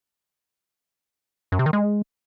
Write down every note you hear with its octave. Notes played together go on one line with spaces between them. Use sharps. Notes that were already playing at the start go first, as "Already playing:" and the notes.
F#2
C3
D#3
G#3